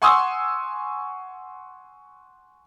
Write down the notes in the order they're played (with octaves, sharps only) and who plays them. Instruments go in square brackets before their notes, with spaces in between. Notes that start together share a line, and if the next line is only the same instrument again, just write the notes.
[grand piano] F#5 G#5 C6 C#6 D#6 E6